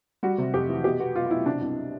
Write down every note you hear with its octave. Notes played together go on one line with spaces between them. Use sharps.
G3 F#4
C3
F2 G4
E3
B2 G4
B3 F#4
B2 F4
F4
B2 E4
C3 D4
C2